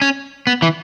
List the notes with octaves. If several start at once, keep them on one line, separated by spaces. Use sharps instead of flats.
C#4
B3
E3